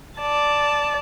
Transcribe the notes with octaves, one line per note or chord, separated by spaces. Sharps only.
D5 A5